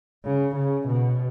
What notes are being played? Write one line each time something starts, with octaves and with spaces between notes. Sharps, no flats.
C#3
C#3
B2